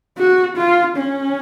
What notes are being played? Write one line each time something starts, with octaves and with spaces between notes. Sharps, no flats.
F#4
F4
C#4